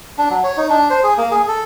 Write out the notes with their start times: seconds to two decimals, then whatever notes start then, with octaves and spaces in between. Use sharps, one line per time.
0.18 D4
0.30 F#3
0.44 C#5
0.57 D#4
0.70 D4
0.90 C5
1.03 G#4
1.18 A#3
1.31 G#4
1.48 A4